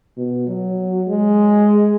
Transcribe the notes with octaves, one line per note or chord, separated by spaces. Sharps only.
B2
F#3
G#3